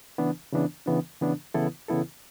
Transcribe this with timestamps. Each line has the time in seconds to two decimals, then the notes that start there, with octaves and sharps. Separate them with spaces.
0.18 C#3 E3 B3 D4
0.52 C#3 E3 B3 D4
0.86 C#3 E3 B3 D4
1.21 C#3 E3 B3 D4
1.54 C#3 E3 B3 E4 A4
1.88 C#3 E3 B3 E4 A4